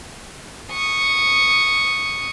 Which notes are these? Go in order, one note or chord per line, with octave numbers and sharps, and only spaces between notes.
C#6 D#6